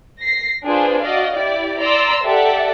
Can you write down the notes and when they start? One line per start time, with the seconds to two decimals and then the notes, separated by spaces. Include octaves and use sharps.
0.20 A#6 C7
0.65 D4 F4 G#4 B4 C5
1.02 F#4 D5 D#5 F5
1.35 E4 G4 D5
1.80 D5 A#5 C6 E6
2.25 G4 A4 D5 E5 F#5